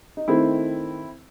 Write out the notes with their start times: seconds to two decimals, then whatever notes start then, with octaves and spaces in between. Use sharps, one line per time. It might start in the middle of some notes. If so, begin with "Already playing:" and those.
0.17 D#4
0.28 D#3 A3 C4 E4